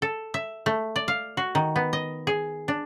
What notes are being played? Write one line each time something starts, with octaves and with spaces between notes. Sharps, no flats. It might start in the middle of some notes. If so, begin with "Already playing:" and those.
A4
E5
A3
D5
F5
F#4
D#3
B3
D#5
G#4
D4